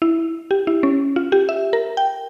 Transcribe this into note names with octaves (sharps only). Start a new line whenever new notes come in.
E4
G4
E4
C#4
F4
G4
E5
A#4
G5